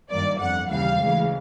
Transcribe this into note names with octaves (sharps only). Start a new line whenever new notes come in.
G2 D#3 F#3 A#3 D5
G1 F2 D3 F#5
D#2 C#3 E3 G3 F5
D2 C#3 E3 G#3